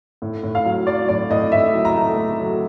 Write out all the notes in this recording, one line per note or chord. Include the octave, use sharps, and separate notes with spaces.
A2
A2
F5
F#3
F#3 D5
A2 D5
A2 D#5
A2 E5
F#3
A#5
A3
A3
F#3